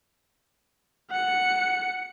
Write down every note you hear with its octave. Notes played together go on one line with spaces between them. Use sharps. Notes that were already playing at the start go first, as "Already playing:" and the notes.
F#5 C#7